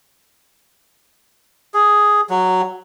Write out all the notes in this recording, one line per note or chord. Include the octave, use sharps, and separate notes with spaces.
G#4
F#3